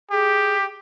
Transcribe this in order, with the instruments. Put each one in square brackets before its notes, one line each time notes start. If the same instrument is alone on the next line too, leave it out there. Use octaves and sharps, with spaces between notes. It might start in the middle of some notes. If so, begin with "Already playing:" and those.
[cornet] G4 [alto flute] G#4